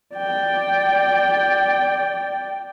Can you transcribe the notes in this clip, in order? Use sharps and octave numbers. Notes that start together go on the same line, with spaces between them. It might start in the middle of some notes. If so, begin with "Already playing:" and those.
D5 G5